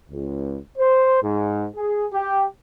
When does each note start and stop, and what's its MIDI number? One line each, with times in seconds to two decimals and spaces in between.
0.11 0.58 37
0.78 1.21 72
1.23 1.66 44
1.76 2.06 68
2.13 2.45 67